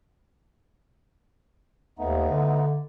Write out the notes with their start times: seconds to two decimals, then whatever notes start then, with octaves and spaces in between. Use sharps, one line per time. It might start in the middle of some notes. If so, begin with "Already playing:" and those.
1.99 D#2 A3 B3 D#4
2.30 D3